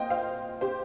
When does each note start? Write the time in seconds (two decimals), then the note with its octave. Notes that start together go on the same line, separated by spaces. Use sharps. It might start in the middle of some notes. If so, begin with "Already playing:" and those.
Already playing: A#2 C5 D#5 F5 G5
0.10 C5 F5
0.61 G4 C5